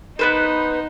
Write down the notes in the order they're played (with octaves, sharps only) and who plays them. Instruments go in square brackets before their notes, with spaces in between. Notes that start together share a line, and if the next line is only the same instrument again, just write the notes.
[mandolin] B3 B4 C5 [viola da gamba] D#4